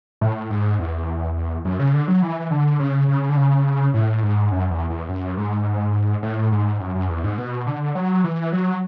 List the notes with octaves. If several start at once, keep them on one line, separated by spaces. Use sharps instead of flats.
A2
G#2
E2
F#2
C#3
D3
F#3
E3
D3
C#3
C#3
D3
C#3
A2
G#2
F#2
E2
E2
F#2
G#2
A2
G#2
F#2
F#2
E2
G#2
B2
D3
F#3
E3
F#3